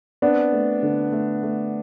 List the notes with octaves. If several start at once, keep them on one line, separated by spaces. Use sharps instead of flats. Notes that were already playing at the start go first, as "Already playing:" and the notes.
B3 C4 D4
A3
D3
A3
A3